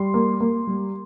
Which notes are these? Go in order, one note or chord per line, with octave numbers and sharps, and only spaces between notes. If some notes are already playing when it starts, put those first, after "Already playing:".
Already playing: G3 C6
A#3
A#3
G3